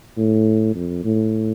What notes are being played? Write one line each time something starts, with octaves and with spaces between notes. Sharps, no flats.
A2
F2
A2